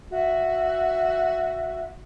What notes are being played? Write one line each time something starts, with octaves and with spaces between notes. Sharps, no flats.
F#4 E5